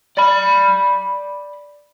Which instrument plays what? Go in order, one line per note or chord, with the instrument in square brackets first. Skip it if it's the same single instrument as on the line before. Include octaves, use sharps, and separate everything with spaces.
[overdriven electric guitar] D5 B5